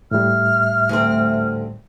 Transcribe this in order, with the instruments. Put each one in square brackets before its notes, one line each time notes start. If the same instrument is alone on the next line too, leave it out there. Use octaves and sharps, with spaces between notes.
[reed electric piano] A2 G3 [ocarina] E5 [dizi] F6
[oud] D2 C4